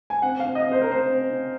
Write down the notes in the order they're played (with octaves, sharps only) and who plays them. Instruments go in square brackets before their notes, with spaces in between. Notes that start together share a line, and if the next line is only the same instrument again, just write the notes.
[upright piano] G#5
C4 F#5
F5
C4
D#5
C4
C5
A#4
C4 C5
C4
C4